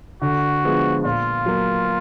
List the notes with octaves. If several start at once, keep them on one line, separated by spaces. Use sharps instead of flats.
D3 F#4
F3 G#3 B3 D4
A#2 F4
F#3 A#3